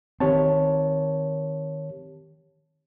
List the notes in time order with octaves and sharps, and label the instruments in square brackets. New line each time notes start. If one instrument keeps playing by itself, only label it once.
[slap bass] D#3 C4 [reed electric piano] G4 C#5 A5